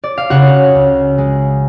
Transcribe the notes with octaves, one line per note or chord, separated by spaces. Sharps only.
D5
F5
C#3 F#4 F#5
C#2
G#3